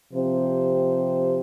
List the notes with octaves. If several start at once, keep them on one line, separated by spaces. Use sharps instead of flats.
C3 F3 C4 G4 C5